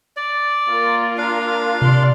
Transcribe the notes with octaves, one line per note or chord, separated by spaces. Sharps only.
D5
A#3 F4 A#4
D4 F5
C3 D5 C6